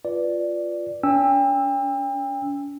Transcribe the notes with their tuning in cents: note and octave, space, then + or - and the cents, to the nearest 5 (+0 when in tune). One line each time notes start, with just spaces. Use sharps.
F4 +0 B4 +0 D5 +0
C#4 +45 G5 +35 E6 +0